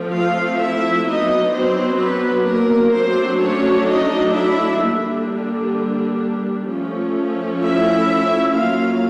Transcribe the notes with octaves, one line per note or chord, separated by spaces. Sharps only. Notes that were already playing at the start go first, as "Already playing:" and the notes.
Already playing: F3 A3 C4
F4 F5
E4 E5
F#3 B3 D4 D#4 D#5
C4 C5
B3 B4
A#3 A#4
F#3 A3 C4 D4 C5
C#4 C#5
D#4 D#5
E4 E5
D3 G3 A#3 D4
F3 A3 C#4
E4 E5
F#3 A#3 C#4 F4 F5